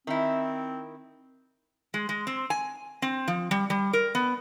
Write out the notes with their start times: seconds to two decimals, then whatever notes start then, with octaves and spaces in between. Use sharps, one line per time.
0.07 D#3 C4 E4
1.94 G#3
2.09 G#3
2.27 C4
2.50 G#5
3.02 C4
3.28 F3
3.51 G3
3.70 G3
3.93 A#4
4.15 B3